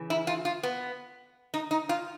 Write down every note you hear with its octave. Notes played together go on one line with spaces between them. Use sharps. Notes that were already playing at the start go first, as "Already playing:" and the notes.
Already playing: C#3 E3
E4
F4
F4
B3
D#4
D#4
F4